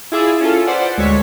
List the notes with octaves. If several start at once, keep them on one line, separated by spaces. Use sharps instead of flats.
E4 F4 G#4 D5 E5
C#4 F4 A4
B4 C5 D5 F#5
D2 G#3 A4 C#5 B6